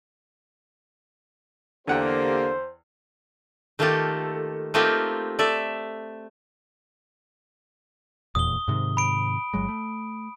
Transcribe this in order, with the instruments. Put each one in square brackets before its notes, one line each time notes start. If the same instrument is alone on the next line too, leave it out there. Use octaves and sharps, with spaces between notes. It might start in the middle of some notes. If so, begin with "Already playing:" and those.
[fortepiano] E2 F#5 G5 [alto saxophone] D3 [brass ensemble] A#3 G4 [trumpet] C5
[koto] D#3 A3 A#3 F4 G4 A4
A3 A#3 C4 D#4 F4 G4
A3 D5 E5
[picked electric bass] D#1 E2 A#2 [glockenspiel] D#6 G7
[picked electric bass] G#2 C3 D#3
[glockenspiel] B5 D7
[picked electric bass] G1 F#3 G#3
A3